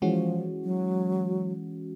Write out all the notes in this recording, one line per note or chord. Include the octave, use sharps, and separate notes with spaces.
E3 F3 G#3 C#4 F#4
F#3